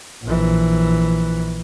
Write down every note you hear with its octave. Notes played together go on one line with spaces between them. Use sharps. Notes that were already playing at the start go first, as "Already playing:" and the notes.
A#1 E3